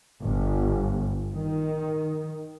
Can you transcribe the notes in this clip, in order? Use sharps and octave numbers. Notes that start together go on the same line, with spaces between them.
G1
D#3